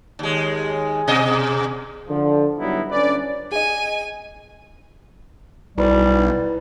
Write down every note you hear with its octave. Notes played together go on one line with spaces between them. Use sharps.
D#2 G#3
B2 G#4 D#5
D3 F3
G2 F#3 G3 B3 D#4 E4
G1 C#4 D4 B4 D5
G#4 D#5 G#5 D#7
B1 G3 E4 B4 C5